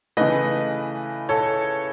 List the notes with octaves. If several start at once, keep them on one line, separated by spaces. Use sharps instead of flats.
C#3 E3 A3 B4 D#5
A4 C#5